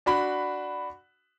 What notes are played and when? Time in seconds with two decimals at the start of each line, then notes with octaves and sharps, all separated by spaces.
0.06 D4 F#4 B5